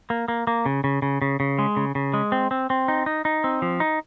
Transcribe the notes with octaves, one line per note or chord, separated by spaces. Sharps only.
A#3
A#3
A#3
C#3
C#3
C#3
C#3
C#3
G#3
C#3
C#3
G#3
C4
C4
C4
D#4
D#4
D#4
C4
F3
D#4